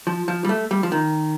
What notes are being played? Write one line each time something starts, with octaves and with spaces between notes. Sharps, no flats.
F3
F3
G3
A3
G3
F3
D#3